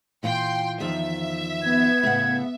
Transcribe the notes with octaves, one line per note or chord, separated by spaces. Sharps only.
A#2 E3 F4 G5 C6
E2 D#3 F3 E5
B3 G#6
A2 C#3 F#5